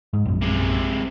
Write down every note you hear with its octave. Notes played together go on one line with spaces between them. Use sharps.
G#2
A#1 F#2
C3 G#3